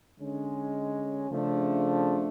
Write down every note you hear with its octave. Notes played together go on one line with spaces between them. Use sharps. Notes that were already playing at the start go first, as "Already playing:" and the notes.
D3 G#3 C#4
C#3 F3 A3 D4